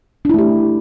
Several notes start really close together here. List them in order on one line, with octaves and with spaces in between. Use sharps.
D4 E4 A3 G4